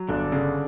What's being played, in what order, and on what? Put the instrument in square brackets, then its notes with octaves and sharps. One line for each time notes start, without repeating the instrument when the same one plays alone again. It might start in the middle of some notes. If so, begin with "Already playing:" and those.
Already playing: [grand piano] F#3
[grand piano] G1 [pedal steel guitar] D3 D4
[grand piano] C#3